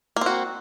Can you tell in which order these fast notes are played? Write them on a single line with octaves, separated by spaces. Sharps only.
A#3 C4 F#4